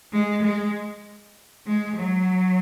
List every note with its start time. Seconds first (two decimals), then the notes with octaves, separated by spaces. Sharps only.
0.13 G#3
0.43 G#3
1.67 G#3
1.97 F#3